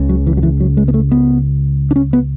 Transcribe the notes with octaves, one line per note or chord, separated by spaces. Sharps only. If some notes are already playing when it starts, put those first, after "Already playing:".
Already playing: C#2 C#3
F#3
E3
F#3
E3
F#3
G#3
B3
A3
B3
D4
C#4
B3